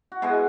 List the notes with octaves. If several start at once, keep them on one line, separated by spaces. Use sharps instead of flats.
F#4
B2 G#3 B3 E4 G#4